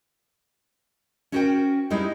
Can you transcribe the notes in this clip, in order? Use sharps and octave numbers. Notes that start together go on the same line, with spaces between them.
C#4 E4 F#4 A#4 C5 G5
G3 G#3 C4 C#4 D#4 E4